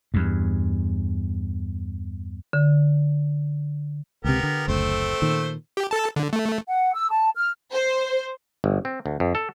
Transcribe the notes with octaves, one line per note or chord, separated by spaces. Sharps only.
E2 G2
D3
C#2 C3 B3 G4 A#4
D3
F#1 D2 A3 C4 C5
A#2 D#3
G4
A4 A5
D3
A3
F#5
E6
A5
F6
C5
G1
C4
D2
F2
A4